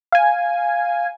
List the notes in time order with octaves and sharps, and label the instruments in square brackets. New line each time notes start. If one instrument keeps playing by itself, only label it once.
[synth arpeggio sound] F5 G#5